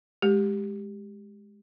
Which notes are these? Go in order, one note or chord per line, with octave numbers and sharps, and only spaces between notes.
G#3 G4